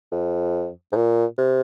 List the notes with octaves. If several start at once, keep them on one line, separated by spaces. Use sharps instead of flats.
F2
G#2
A#2
C3